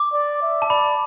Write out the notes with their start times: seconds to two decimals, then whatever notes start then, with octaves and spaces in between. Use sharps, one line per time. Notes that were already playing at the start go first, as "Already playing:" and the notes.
Already playing: D6
0.13 D5
0.42 E5
0.62 A5
0.70 D5 B5